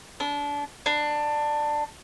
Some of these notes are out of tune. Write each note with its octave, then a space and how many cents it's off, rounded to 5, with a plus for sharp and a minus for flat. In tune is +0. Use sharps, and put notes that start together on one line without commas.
D4 -25
D4 +15